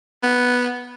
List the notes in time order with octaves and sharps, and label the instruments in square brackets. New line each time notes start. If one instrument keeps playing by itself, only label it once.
[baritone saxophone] B3